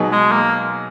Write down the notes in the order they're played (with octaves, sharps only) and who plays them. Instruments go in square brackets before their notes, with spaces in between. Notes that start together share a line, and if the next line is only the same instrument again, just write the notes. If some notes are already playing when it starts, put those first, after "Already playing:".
Already playing: [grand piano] B2 F#3 B3 D#4 G#4
[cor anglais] G#3
A#3